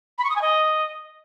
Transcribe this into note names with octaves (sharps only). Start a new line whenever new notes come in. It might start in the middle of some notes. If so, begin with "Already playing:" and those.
B5
C#6
D#6
G#5
D#5